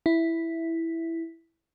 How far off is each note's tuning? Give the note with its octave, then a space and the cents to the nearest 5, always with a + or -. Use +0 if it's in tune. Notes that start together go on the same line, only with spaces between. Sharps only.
E4 +0